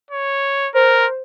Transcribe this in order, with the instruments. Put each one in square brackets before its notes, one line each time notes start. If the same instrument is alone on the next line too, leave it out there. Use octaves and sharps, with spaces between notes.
[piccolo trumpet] C#5
[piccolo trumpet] A#4 [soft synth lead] C5